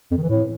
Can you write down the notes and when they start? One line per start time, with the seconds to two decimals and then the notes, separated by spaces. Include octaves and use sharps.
0.11 F2
0.17 D#3
0.23 E3
0.29 A2